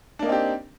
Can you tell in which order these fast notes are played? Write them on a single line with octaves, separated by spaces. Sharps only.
D4 A#3 D#4 C4 G4